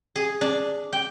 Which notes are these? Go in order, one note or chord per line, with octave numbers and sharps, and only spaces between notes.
G#4
D4
G5